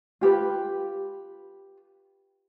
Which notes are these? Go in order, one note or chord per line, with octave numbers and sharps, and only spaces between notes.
F4 G4 B4